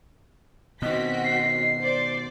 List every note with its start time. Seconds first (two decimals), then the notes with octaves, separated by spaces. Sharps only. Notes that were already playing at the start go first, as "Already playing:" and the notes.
0.82 B2 D#3 C4 F#4 D#5 B6
1.25 C7
1.78 C5 D5